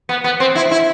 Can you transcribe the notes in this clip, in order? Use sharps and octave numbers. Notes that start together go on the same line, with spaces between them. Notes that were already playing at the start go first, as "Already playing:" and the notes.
B3
B3
C4
E4
E4